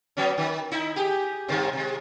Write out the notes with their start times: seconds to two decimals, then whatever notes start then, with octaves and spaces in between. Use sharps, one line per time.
0.17 F#3 B3 C#4
0.38 D#3
0.72 D#4 E4
0.96 G4 G#4
1.48 G2 C3 D#3
1.73 C3 G#3